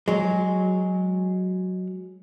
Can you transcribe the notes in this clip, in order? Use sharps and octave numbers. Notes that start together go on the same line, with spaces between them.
F#3 G#3